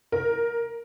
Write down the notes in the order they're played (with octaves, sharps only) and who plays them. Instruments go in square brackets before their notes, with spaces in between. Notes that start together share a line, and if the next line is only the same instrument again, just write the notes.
[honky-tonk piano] A#4